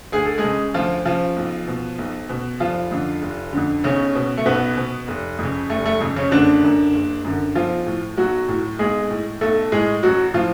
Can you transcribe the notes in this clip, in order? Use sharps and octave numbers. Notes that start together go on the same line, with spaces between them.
D2 G#4
A4
G#3 G#4
C#3
D2 F3 F4
C#3 F3 F4
B1
B2
B1
B2
F1 F3 F4
F2 D3
F1
F2 D3
B1 C#3 C#4
B2
A3
B1 B2 B3
B2
F1
F2 C#3
F1 A3
A3
F2 C#3
C#3 C#4
F#1 D3 D4
F#2 D3
F#1
F#2 D3
B1 F3 F4
A2
B1 F#3 F#4
A2
B1 G#3 G#4
A2
B1 A3 A4
A2 G#3 G#4
A1 F#3 F#4
A2 F3 F4